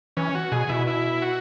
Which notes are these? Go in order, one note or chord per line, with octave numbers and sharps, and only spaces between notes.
E3 C#4
F#4
B2 G#4
B2 E4
E4
F#4